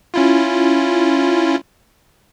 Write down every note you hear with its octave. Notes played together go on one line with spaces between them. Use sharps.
C#4 E4 F4